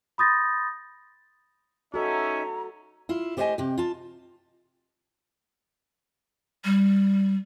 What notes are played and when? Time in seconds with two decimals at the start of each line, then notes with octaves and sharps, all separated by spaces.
0.18 B5 C6 D#6 G6 A6 A#6
1.94 C#4 D#4 F#4 A4 E5 A#5
3.09 E4 F4
3.37 A3 G4 C5 D5 D#5 G#5
3.58 C3 G4
3.78 F4 A5
6.65 G3